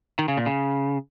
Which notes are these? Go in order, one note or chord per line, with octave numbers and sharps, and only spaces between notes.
D#3
C#3
A#2
C#3